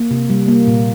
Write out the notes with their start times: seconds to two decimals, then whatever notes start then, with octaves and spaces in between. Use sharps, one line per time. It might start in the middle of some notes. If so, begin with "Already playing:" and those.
Already playing: A#3
0.11 C3
0.30 G3
0.48 A#3
0.67 A#2